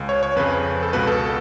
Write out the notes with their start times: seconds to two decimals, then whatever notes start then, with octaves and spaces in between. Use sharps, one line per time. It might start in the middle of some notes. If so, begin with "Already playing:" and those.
Already playing: C#2 C#3
0.09 C#5
0.23 C#5
0.36 F2 C#3 B4
0.83 A4
0.93 C#2 B2 B4
1.07 A4